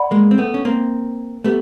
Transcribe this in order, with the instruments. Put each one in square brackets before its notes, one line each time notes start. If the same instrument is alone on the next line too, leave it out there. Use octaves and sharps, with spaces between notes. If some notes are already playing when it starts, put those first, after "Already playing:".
Already playing: [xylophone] D5 F#5 B5
[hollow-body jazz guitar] G#3 A#3
C4
A3 B3
C#4
A#3 C4
[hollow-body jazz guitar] A3 B3 [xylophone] G4